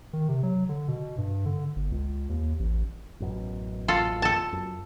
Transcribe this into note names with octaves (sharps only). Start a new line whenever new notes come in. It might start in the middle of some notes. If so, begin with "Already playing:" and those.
D#3
C3
F#3
D3
B2
G2
D3
G1
C#2
D#2
A1
A1 F#2 B2
F4 A4
A4 A5
F#2